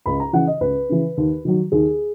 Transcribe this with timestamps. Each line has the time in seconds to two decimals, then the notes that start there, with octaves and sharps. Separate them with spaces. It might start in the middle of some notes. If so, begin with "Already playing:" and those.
0.06 C#2 B5
0.20 A#5
0.33 C#3 E3 F#5
0.47 D#5
0.61 C#2 B4
0.89 C#3 E3
1.17 D#2
1.45 D#3 F#3
1.72 D#2 G#4